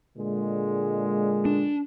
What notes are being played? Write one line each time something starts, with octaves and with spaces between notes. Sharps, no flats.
A#2 D3 G#3
D4